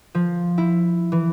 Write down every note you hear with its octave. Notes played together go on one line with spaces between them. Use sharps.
F3
E4
E3